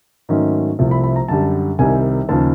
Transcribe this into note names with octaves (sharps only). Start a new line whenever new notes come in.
G#2 D#3 F#3 A3 C#4
C2 C3 F3 A3
B5
B5
A#5
F#2 D3 G3 A5
C2 C3 D#3 G3 G#5
D#2 C#3 F3 A5